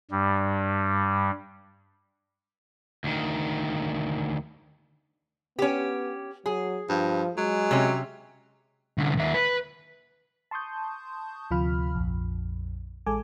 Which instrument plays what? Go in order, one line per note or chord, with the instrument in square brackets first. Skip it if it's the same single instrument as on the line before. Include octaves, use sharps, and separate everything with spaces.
[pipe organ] G2 G3
[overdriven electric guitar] D2 D#3
[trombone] B3 [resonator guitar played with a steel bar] C#4 G4
[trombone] F#3 [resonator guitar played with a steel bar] G#4
[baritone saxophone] G2 [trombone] F3
[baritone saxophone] F#3 [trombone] G#3
[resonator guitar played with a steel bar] C3 C#4
[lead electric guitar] C2 D3
D#2 E5
B4
[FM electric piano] A5 C6 C#6 D#6 G6
D2 C3 F3 F4 B5 F6
A#1 F2
A1 G#3 A4 G#5 D6